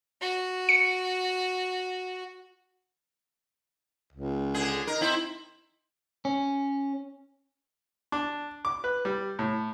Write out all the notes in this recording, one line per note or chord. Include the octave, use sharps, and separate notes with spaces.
F#4
C#7
C#2
D3 G#4
D#4 A#4
C4 E4
C#4
D4
D6
B4
G3
A2